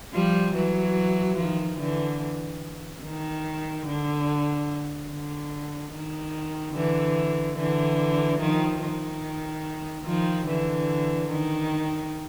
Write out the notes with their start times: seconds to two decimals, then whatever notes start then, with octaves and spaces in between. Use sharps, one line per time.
0.13 F3 G3
0.55 E3 F#3
1.37 D#3 F3
1.79 D3 E3
3.03 D#3
3.86 D3
5.09 D3
5.92 D#3
6.74 D3 E3
7.57 D3 E3
8.40 D#3 F3
8.81 D#3
10.05 D#3 F3
10.47 D3 E3
11.29 D#3